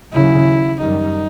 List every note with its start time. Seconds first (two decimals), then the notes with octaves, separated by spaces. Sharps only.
0.12 D#2 C#3 F#3 E4
0.81 F#2 D#3 G3 D#4